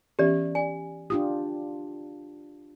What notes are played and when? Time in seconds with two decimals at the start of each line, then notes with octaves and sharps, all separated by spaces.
0.19 E3 B3 C#4 G4 D5
0.55 D5 G#5
1.10 D4 F4 G4 D#6